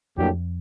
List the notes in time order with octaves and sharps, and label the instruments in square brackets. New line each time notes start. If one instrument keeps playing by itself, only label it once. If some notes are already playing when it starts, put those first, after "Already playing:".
[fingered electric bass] F2 [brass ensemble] A2 F#3 A#3 D4 G4